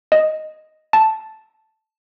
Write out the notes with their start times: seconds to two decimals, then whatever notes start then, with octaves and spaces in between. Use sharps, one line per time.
0.12 D#5
0.93 A5